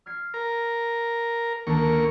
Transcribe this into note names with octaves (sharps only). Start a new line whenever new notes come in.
F6 G#6 C7
A#4
D2 D#3 A#3 A4 A5 C#6